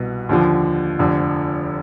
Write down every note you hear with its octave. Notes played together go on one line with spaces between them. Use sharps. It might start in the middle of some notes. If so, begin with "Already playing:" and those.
Already playing: C2 B2
D#2 D3 F3
F1 F2 D3 F3